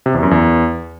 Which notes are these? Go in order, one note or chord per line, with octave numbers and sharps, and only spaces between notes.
C3
E2
F#2
E2